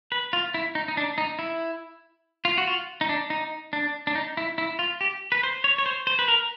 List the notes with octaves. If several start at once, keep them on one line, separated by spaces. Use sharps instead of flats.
B4
F4
E4
D#4
D#4
D4
D#4
E4
F4
F#4
F4
D#4
D4
D#4
D4
D4
D#4
E4
E4
F4
G4
B4
C5
C#5
C#5
C5
C5
B4
A#4